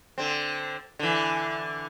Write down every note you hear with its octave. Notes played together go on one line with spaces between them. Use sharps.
D3 C4
D3 E3